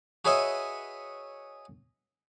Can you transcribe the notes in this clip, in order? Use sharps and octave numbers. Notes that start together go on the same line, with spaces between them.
F#4 G#4 B4 C#5 D#5 E5